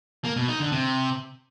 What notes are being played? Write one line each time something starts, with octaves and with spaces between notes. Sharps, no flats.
A#3
B2
D#4
D3
C3